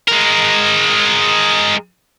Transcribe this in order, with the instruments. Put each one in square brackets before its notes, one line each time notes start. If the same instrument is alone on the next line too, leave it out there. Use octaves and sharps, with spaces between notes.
[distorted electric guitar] G#3 A#4